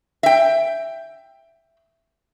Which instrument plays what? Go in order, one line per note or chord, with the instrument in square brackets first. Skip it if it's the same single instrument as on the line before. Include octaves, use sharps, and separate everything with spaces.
[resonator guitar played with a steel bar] E5 G5